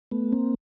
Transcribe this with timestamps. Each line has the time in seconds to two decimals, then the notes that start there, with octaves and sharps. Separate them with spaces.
0.11 A3 B3
0.32 A#3 C4